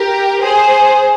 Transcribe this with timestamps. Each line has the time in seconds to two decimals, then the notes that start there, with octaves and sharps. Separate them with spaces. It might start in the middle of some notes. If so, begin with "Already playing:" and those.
Already playing: G4 A#4
0.41 G#4 C5